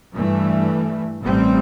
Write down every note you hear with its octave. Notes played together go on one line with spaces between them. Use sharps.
G2 E3 A3
A1 A2 G3 C4